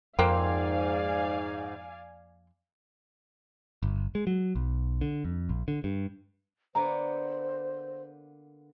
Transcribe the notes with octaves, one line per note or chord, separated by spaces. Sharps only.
F2 G#2 A#3 C4 D5 F5 G#5
G1
G#3
F#3
B1
D3
F2
A#1
D3
G2
D3 A#3 B3 C5 A#5